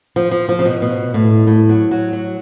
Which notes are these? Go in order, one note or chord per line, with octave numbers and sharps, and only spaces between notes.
F3
F3
F3
C#3
B2
B2
A2
A2
F#3
F#3
F#3